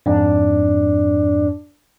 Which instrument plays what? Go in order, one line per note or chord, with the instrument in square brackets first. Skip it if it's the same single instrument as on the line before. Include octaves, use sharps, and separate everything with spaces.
[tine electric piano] F2 G#2 [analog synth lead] D4